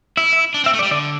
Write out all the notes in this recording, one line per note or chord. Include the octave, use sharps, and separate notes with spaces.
E4 E5
E5
D4
C4
E5
A3
D5
G3
D3 D5